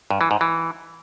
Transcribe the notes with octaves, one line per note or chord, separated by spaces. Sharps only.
G2
E3
G#2
E3